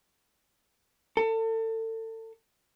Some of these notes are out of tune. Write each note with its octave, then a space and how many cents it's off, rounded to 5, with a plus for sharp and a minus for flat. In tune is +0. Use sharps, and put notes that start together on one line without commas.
A4 +30